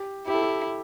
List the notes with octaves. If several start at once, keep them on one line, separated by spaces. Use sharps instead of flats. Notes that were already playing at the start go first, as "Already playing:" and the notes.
Already playing: G4
E4 G4
A4
G4